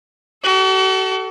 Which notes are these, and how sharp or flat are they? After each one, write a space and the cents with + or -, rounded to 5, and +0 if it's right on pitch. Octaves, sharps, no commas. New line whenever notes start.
F#4 +45 A4 +0